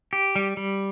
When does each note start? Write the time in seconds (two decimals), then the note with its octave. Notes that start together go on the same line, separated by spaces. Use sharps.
0.13 G4
0.36 G3
0.57 G3